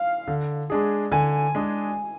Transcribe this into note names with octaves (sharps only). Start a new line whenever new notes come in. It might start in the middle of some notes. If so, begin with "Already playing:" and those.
Already playing: F5
D3
G#3 D4 G#4
D3 G#5
G#3 D4 G#4